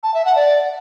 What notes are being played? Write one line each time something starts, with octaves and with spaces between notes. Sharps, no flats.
A5
E5
F#5
D5